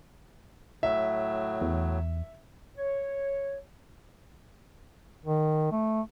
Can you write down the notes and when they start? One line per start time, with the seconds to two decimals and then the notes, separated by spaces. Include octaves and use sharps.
0.83 A2 F#3 E5
1.61 E2
2.77 C#5
5.26 D#3
5.72 A3